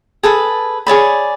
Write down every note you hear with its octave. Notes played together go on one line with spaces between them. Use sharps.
G#4 A4 B4 A5
G#4 C#5 D5 B5